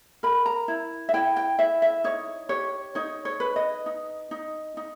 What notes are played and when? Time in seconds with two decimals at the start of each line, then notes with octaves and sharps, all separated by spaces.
0.23 A#4 B5
0.46 A#5
0.68 E4
1.09 E5
1.14 E4 G5
1.36 G5
1.59 E4 E5
1.82 E5
2.04 D#4 C#5
2.49 G4 C#5
2.95 D#4 C#5
3.25 C#5
3.40 B4
3.56 D#5
3.86 D#4
4.31 D#4
4.77 D#4